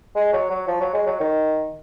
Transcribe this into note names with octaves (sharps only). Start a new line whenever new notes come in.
G#3
F#3
F#3
F3
F#3
G#3
F#3
D#3